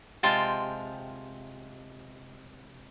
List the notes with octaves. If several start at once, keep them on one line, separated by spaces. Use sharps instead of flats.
C3 G#3 F4 G5 A5